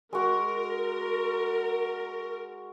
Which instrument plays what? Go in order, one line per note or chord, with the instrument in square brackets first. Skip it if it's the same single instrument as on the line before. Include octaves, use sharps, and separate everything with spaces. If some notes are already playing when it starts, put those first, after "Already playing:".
[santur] G#3 F#4 [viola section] A#4